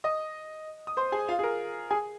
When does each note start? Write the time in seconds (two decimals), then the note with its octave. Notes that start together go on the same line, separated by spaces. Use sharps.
0.04 D#5 D#6
0.87 D#6
0.97 C5 C6
1.12 G#4 G#5
1.29 F4 F5
1.39 G#4
1.43 A#4
1.91 G#4 G#5